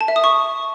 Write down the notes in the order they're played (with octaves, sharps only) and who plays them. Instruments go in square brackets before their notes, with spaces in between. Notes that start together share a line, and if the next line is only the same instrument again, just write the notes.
[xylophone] A5
E5
D#6
C#6